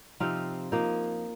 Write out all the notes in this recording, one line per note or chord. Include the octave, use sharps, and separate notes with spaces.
C3 F3 C4 D#4 F4 F5
F3 A#3 D#4